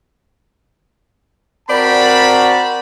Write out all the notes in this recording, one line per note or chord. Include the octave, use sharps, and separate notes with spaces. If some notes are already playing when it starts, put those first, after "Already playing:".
C4 F#4 A#4 D5 A5 B5